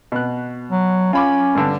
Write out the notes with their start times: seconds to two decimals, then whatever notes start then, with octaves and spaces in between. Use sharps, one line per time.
0.12 B2 F#6
0.72 F#3
1.13 C#4 F4 B5 D6
1.55 G2 D3